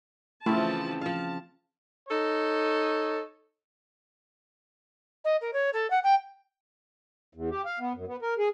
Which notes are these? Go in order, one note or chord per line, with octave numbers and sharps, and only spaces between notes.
C#3 E3 F3 A3 C4 E4 A5
F3 F5 A5
D#4 A4 C#5
D#5
A#4
C#5
A4
F#5
G5
E2
G4
F5
B3
F#2
B3
A#4
G#4